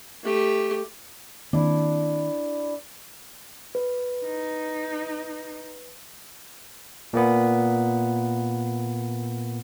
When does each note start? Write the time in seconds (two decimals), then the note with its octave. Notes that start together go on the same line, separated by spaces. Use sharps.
0.24 A3 G4
1.53 D#3 A#3 C4 D4 E4
3.75 B4
4.25 D#4
7.13 A#2 A#3 B3